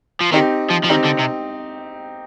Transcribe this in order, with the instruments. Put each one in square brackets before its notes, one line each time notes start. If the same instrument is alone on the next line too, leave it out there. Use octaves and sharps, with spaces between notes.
[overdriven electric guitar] F3
[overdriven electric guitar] D#3 [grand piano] C4 D#4 G4
[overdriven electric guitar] F3
F3
[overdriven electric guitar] D#3 [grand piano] C4 D#4 G4
[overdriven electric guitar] D3
C3